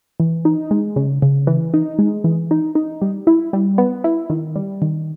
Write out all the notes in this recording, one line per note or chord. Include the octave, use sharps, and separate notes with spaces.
E3
D#4
G#3
C#3
C#3
E3
D#4
G#3
E3
D#4
D#4
G3
E4
G3
B3
E4
D#3
G3
D#3